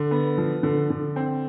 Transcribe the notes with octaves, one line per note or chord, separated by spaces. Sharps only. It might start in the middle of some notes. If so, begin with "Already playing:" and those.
Already playing: D3
B3
F3
D3
D3
C4